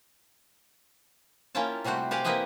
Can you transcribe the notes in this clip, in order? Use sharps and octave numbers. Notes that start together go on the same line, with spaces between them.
A#3 C#4 E4 F4 G5 A5
C3 G3 A3 F#4 C5
G4 C5 D5 F5 F#5 G#5
A#3 C4 E4 B4 D#5 E5